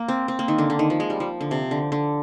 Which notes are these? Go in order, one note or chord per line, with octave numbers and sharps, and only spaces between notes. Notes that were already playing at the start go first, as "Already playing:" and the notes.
Already playing: A#3
C4
C4
A#3
D#3
D3
D3
D#3
F3
G#3
G3
F3
D3
C3
D3
D3